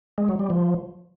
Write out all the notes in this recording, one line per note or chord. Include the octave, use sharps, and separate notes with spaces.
G#3
F#3
G3
F3